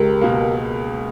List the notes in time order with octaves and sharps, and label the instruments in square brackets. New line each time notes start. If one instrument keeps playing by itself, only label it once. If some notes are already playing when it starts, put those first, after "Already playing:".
Already playing: [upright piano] C#2 [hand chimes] G4 A#4
[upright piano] B2 A#3